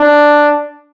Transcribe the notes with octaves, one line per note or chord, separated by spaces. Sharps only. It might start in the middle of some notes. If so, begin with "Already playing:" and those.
Already playing: D4